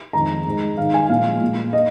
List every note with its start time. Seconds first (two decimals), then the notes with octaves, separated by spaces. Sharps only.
0.13 F2 D#3 G#3 A#5
0.45 G#2 G#3
0.77 G#2 D#3 G#3 F5
0.94 G#5
1.09 A#2 F3 G#3 F5
1.41 A#2 G#3
1.73 D#5